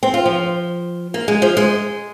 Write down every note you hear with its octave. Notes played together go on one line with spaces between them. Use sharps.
C4
F4
F3
A#3
G#3
F3
G#3